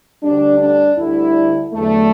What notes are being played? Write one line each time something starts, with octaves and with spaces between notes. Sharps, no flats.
D2 D3 G3 D4
D4
D2 D3 G3 E4
E2 D3 F#3 A3